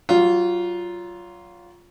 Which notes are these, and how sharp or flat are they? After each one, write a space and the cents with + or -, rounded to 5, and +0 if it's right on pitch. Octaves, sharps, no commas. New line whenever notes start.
F#3 +30 F4 +0